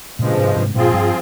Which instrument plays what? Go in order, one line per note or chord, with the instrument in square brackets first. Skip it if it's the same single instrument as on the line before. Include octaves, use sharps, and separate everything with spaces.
[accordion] G2 F3 G#3 [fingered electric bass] A#2 C#3
[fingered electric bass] G#2 C3
G#2 C3
[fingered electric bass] G2 A#2 [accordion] F3 C4 F4 G#4
[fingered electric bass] G2